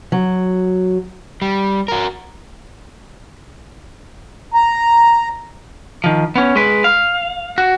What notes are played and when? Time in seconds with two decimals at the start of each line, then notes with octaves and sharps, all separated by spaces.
0.12 F#3
1.42 G3
1.88 F#4 A#4
4.54 A#5
6.04 D#3 F3
6.36 B3 C#4
6.56 G#3 B4
6.84 F5
7.58 F#4